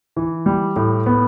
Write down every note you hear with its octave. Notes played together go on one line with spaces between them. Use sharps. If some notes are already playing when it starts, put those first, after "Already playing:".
E3
G3
A2
B3